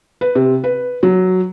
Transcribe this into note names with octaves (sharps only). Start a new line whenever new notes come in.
B4
C3
B4
F#3